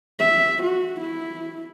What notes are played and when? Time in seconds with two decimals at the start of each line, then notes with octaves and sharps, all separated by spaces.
0.19 E5
0.64 F#4
1.01 E4